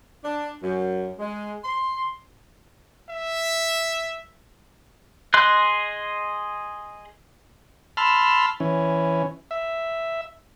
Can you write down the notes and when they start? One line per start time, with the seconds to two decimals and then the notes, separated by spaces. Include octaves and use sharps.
0.24 D4
0.62 F#2
1.19 G#3
1.64 C6
3.09 E5
5.34 G#4 D#5 C6 F#6
7.97 A5 B5 C6 E6 F6
8.60 E3 C#4
9.51 E5